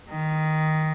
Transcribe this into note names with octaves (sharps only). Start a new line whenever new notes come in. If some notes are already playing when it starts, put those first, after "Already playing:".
D#3